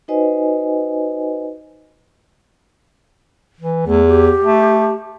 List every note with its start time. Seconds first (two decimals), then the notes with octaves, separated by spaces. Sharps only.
0.08 D#4 F#4 B4 C5 D#5 G#5
3.60 E3
3.87 E2 A3
4.07 G4
4.44 A3